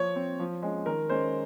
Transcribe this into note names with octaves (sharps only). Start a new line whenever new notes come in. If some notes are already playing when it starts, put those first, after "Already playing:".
Already playing: F3 C#5
C4
F3
G#3 C#4
D#3 A#4
G#3 C#4 C5